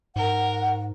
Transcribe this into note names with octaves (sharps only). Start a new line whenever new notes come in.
G#2 A#4 F#5